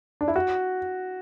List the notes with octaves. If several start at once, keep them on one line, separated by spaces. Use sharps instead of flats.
D4
E4
F#4